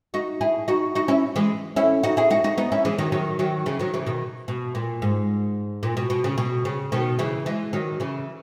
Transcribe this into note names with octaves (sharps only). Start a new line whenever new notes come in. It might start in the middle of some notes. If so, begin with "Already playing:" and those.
D#4 F#4
E4 G#4
D#4 F#4
D#4 F#4
C#4 E4
E3 G#3
C#4 E4
D#4 F#4
E4 G#4
D#4 F#4
D#4 F#4
B3 D#4
C#4 E4
E3 G#3
D#3 F#3
D#3 F#3
D#3 F#3
C#3 E3
D#3 F#3
C#3 E3
B2 D#3
B2
A#2
G#2
A#2
B2
B2
C#3
B2
C#3
B2 D#3
C#3 E3
E3 G#3
D#3 F#3
C#3 E3